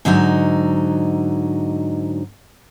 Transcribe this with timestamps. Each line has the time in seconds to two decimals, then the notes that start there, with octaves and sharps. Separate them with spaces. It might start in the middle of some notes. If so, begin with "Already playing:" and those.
0.05 G#2 D3 F#3 D#4